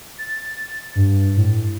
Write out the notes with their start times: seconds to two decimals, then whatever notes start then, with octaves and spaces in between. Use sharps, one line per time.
0.18 A6
0.96 G2
1.37 A2